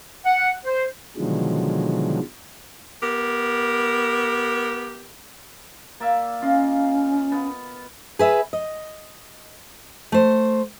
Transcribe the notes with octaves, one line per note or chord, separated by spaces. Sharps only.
F#5
C5
B2 D3 D#3 F3 F#3 G#3
B3 G4 A#4
A#3 D5 E5
C#4 F4 D#5 F5
B3
G#4 B4 E5
D#5
A3 C5